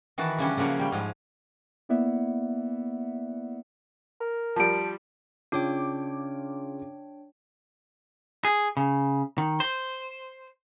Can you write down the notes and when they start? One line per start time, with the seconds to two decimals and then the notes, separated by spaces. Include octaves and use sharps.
0.18 D#3 E3 F#4 B4 A5
0.38 C#3 G3 C#4 D4
0.57 C#3 F3 F#3 A#3 F#5
0.79 G3 G5 B5
0.92 G#2 F3
1.89 A#3 B3 E4 D5 E5 F#5
4.21 A#4
4.56 F3 G3 A5 D7
5.52 C#3 D4 F4 C#5 G5 D6
8.45 G#4
8.77 C#3
9.38 D#3
9.60 C5